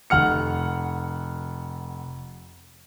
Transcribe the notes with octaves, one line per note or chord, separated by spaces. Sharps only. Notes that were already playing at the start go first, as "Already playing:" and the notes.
F1 F#5 F6 C#7